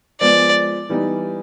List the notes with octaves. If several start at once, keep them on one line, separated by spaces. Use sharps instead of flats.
F3 G#3 B3 D5
E3 G3 B3 D#4